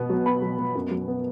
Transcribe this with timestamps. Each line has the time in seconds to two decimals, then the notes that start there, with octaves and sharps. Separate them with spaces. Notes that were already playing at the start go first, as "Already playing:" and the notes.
Already playing: B2 B3
0.10 F#3
0.26 B3 B5
0.42 F#3
0.59 B2
0.75 F#2
0.91 F#3
1.08 B3